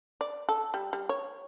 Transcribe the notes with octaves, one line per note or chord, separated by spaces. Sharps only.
D5
A4
G3
G3
C#5